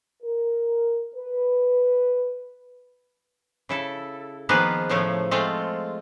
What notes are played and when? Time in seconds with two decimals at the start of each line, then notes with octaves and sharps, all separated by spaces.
0.23 A#4
1.15 B4
3.69 C#3 E4 A4
4.49 D#3 F3 A#3 B3 G#4 B4
4.89 A2 C#3 F3 A3 C#5
5.31 G#3 A3 C4 F4 A4